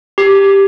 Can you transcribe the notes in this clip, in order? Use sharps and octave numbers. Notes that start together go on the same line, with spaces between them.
G4